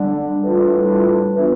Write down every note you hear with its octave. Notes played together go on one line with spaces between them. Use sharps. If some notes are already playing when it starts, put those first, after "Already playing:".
Already playing: D3 G3 D4
A2 E3 G3 D4 F4
E3 B3 D4 F4